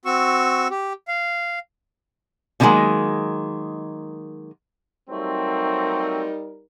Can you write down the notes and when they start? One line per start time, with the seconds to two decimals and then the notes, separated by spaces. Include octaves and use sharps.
0.05 C4 F#4 C#6 E6
0.71 G4
1.08 F5
2.60 B2 D3 D#3 F#3 G#3 A#3
5.09 F#3 G3 A3 C4 D#4 A#4